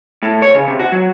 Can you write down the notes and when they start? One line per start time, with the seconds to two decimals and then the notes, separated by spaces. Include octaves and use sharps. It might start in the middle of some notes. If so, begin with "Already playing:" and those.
0.23 A2
0.42 C#5
0.55 C#3
0.68 C3
0.79 F#4
0.92 F#3